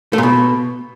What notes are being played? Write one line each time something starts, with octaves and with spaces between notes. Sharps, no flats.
A3
A#2
B2